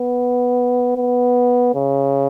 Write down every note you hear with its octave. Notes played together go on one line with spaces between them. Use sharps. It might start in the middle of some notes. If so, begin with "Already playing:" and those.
Already playing: B3
B3
C#3